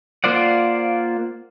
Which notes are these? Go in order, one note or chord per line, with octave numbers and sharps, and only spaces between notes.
A#3 F4 C5 D5 F#5